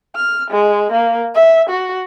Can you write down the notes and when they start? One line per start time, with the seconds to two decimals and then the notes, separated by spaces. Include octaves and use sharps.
0.15 F6
0.50 G#3
0.92 A#3
1.35 E5
1.69 F#4